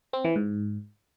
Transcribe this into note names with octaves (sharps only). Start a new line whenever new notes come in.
C4
E3
G#2